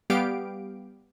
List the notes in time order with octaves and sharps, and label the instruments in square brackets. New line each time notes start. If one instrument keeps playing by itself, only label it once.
[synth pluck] G3 B3 G4 F5 D7